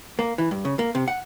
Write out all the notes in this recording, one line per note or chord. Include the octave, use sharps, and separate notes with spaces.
A#3
E3
G2
C#3
A#3
C3
F#5